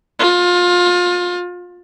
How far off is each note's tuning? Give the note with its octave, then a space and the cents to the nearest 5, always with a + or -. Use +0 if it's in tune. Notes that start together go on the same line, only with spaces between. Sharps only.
F4 +25